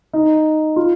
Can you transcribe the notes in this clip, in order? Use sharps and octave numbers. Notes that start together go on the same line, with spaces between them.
D#4
F4